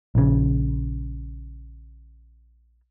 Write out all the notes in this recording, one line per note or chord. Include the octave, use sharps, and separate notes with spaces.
A#1 C#3